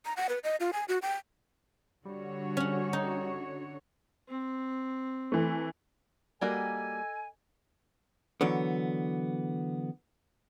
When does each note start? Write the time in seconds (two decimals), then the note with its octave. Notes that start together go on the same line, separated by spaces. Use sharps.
0.05 A#5
0.17 F#5
0.29 B4
0.44 D#5
0.60 F4
0.73 G#5
0.88 F#4
1.02 G5
2.05 D3 G3 F#4 C#5
2.57 C#4 F#5
2.93 D#4
4.28 C4
5.32 E3 A3
6.41 G3 A#3 F#4 A4 D#5 G#5
8.41 D3 E3 F#3 B3